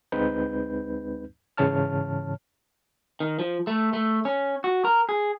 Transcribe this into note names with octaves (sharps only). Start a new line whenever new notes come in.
D2 G#3 C4 D#4 B4 G6
G#2 C#3 E3 C#5 A5 F6
D#3
F3
A3
A3
C#4
F#4
A#4
G#4